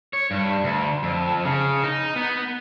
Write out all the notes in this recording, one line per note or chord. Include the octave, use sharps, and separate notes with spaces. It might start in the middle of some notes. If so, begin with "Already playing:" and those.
C#5
G2
D2
F2
C#3
D#4
B3